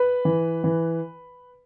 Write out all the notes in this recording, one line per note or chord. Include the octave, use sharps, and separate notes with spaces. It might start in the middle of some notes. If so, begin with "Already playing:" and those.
Already playing: B4 B5
E3
E3